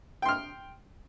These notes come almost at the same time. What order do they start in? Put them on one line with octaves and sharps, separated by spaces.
G5 C6 F6